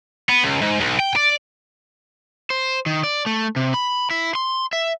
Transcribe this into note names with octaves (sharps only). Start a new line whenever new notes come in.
B3
C#2
G#2
B1
G5
D5
C5
D#3
D5
A3
C3
B5
E4
C6
E5